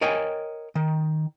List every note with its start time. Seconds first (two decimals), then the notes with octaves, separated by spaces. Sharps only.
0.01 A#4 C#5 D#5 G5 G#5
0.75 D#3